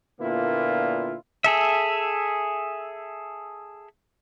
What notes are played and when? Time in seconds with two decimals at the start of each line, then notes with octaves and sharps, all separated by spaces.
0.20 A#2 D3 A#3 B3 E4 F4
1.44 G#4 A4 E5